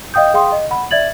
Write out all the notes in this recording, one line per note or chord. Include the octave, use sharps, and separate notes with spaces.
D#5 F5 G5 D#6 G6
G#4 F5 G5 C6 D#6
D#5
F#5 B5
D5 E5 G#6 A6 F#7